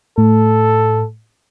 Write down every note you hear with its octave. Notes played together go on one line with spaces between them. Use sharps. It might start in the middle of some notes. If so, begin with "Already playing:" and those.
A2 A4